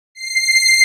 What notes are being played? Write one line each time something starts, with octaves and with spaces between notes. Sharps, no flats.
C7